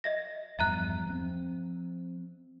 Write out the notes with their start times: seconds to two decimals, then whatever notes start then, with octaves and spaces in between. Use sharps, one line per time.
0.04 D#5 E5 A#6
0.59 E2 G2 F3 E5 A#5 F#6
1.06 F3 C4